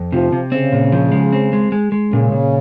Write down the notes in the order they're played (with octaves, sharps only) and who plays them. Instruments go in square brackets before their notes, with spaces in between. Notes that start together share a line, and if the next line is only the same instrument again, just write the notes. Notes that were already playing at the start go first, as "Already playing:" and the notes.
Already playing: [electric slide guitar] F2
[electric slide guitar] C3 [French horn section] F3
[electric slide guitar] C3
[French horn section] C#3 [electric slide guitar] C4
[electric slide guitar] A#2
F3
G#3
C4
G#3
G#3
G#3
[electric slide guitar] A#2 [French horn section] C#3
[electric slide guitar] A#2